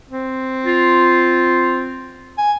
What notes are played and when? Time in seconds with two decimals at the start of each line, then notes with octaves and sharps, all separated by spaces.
0.10 C4
0.66 F4
2.38 G#5